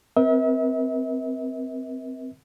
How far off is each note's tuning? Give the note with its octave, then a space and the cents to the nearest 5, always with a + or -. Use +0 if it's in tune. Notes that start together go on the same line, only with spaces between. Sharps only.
C4 -10 A#4 +40 E5 -40